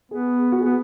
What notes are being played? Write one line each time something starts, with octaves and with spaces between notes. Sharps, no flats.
B3 G#4
F#4
G#4
B3